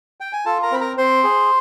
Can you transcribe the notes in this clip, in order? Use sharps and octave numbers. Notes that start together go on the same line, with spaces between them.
G5
G#5
F4 A4 A5
A#4 A#5
C4 B5
A#4 A#5
C4 C5 C6
G#4